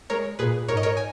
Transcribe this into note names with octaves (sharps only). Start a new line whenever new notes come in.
G#3 A#4 C#5
A#2 G#4 B4
G#2 A#4 C#5
D#5
A#4 C#5
G#5